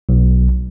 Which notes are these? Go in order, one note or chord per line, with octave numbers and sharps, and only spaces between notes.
B1